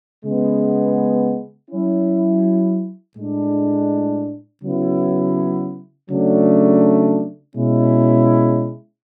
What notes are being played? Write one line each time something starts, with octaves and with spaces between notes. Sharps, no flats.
C#3 G#3 B3
F#3 C#4 E4
A2 G#3 D4
C#3 F#3 B3 E4
C#3 F#3 A3 D4
B2 G#3 C#4 E4